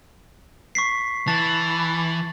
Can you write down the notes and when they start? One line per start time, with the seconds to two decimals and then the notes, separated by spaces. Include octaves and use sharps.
0.75 C#6 B6 C7
1.27 E3 A5 A6